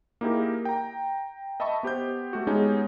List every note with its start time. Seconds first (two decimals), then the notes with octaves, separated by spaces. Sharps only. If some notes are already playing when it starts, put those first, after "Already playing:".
0.21 A#3 D#4 E4 G4 G#4 A#4
0.65 G5 A#5
1.60 D#5 E5 A5 B5 C#6
1.83 B3 G4 C5 G6
2.33 A3 F#4
2.47 G#3 B3 C#4 D#4 G4 G#4